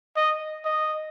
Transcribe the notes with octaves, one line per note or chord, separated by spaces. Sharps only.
D#5
D#5